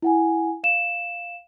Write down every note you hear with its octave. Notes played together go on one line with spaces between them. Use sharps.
E4 F#5 G#5
F5 E7